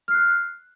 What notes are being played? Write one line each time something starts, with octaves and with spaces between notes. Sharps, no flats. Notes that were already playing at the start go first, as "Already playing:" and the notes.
F6 F#6 C7